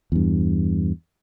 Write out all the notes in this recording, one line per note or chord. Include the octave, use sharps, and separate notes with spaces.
E2 G2